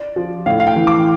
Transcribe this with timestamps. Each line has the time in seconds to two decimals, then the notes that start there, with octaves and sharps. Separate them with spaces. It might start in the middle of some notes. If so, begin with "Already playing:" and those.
Already playing: D5
0.16 F3
0.46 A2 F5
0.60 F5
0.67 G5
0.76 E3
0.87 D6